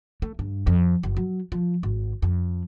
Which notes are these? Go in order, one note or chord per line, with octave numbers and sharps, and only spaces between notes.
A3
G2
F2
F#1
F#3
F3
G#1
F2